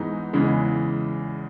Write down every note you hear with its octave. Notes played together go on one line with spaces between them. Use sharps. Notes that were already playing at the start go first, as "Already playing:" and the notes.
Already playing: G#2 E3 G#3 B3 D#4
E2 C#3 E3 G#3